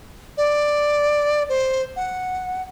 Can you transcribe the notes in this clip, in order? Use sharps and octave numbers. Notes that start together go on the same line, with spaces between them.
D5
C5
F#5